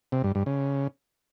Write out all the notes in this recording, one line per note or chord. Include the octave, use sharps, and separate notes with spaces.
C3
G2
G2
C#3